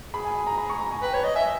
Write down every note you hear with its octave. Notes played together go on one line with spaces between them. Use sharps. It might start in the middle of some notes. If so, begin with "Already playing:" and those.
G#4 B5
G#5
G#5
A#5
B5
C#6
A#5
G#5
B4 G5
C#5
D#5
E5 G#5